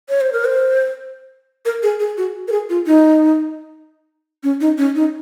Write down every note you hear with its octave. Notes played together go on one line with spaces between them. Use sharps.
C#5
C5
A#4
C5
A#4
G#4
G#4
F#4
A#4
G#4
F4
D#4
C#4
D#4
C#4
D#4